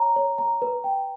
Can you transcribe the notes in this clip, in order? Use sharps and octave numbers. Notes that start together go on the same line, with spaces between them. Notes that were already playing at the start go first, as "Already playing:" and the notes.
Already playing: C#5 A#5
C#5
A#5
B4
G5